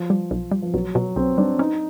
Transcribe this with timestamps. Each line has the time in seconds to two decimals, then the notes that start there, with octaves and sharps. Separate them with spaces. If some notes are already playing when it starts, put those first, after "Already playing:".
Already playing: F3
0.10 G3
0.31 B1
0.52 G3
0.62 F3
0.74 B1 F#3
0.95 B2 F#3
1.16 B1 C4
1.38 G3 D4
1.59 C#4 D#4